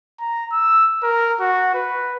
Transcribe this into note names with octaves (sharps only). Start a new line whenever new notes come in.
A#5
E6
A#4
F#4
B4